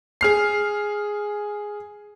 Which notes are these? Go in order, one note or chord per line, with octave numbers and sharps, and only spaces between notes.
G#4 F6 C7